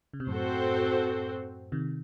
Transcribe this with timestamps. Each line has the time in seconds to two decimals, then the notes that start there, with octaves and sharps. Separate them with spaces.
0.13 C#3
0.20 C3
0.27 F#2 A2 C4 F#4 A4 C5
1.72 C3 D#3